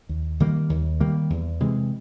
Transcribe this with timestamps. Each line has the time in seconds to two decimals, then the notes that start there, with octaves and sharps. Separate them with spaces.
0.09 D#2
0.40 D#3 G3 A#3
0.70 D#2
1.00 D#3 G3 A#3
1.30 E2
1.60 C3 E3 G#3